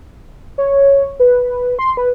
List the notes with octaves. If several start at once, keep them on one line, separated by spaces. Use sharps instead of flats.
C#5
B4
C6
B4